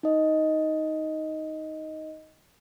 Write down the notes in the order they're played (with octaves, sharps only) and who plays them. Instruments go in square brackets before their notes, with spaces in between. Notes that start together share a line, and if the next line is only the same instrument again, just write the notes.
[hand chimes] D#4 D#5